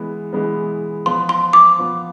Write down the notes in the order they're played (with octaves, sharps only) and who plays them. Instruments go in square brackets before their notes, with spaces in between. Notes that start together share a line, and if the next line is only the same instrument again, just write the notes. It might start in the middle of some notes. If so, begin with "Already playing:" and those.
Already playing: [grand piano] E3 G#3 B3
E3 G#3 B3
[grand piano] F3 B3 F4 [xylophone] C6
[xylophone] C6
D6
[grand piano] F3 B3 F4